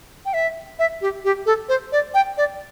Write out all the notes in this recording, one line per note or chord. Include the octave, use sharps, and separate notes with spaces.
G5
E5
E5
G4
G4
A4
C5
D5
G5
D5